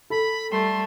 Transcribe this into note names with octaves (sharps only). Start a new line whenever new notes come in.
A4 B5
G3 A3 C6